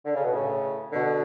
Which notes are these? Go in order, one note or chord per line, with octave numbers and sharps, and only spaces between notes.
D3
C#3
B2
A2 C#3
B2 D3